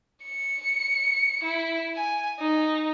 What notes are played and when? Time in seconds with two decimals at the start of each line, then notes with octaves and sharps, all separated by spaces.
0.24 C#7
1.43 E4
1.95 G#5
2.40 D#4